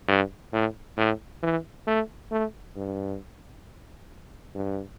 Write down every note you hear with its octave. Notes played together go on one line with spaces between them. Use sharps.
G2
A2
A2
E3
A3
A3
G2
G2